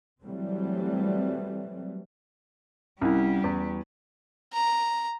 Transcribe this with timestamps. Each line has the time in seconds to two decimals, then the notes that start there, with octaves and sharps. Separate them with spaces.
0.23 E3 F#3 G3 A3 C4
3.01 C2 G3 C#4 E4
3.44 E2
4.53 A#5